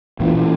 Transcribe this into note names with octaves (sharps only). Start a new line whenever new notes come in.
A#2 E3
A#2